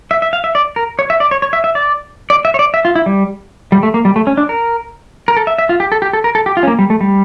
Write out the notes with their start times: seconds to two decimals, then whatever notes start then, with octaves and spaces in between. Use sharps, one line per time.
0.11 E5
0.22 E5
0.33 F5
0.44 E5
0.55 D5
0.76 A#4
0.99 C#5
1.10 E5
1.20 D5
1.31 C#5
1.42 C#5
1.53 E5
1.64 E5
1.75 D5
2.30 D5
2.45 E5
2.54 C#5
2.59 D5
2.74 E5
2.85 F4
2.95 E4
3.06 G3
3.72 G3
3.83 A3
3.94 A#3
4.05 G3
4.16 A3
4.27 C#4
4.37 D4
4.49 A#4
5.28 A#4
5.37 A4
5.47 E5
5.58 E5
5.69 F4
5.80 G4
5.92 A4
6.02 G4
6.13 A4
6.24 A#4
6.35 A4
6.46 G4
6.57 F4
6.63 C#4
6.67 A#3
6.79 G3
6.90 A3
7.01 G3